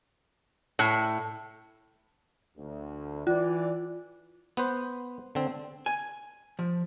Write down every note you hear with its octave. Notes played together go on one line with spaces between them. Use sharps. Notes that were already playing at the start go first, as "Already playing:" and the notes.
A2
D2
E3 F4 D5
B3 B4 C5
D3 C4
G#5
F3